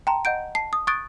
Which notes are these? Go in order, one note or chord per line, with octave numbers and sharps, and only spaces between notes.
G5 A5 A#5 C6
D#5 F#5 G6 D7
A5 C7
D#6
C#6 D#6 F#6 G#6 A6 D7